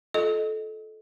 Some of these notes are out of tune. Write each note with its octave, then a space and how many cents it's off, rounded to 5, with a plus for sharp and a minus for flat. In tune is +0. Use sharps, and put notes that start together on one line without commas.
F4 +0 A4 -20 D#5 +0